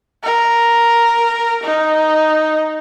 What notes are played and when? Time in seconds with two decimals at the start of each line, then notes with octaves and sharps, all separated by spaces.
0.23 A#4
1.63 D#4